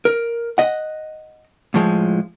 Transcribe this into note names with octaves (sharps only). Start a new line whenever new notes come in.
A#4
D#5 F#5
A2 F3 G#3